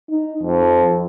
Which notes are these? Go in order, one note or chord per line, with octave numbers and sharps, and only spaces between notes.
D#4
F2